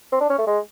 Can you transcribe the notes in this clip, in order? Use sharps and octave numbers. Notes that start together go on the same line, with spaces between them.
C4
D4
C#4
A3
G#3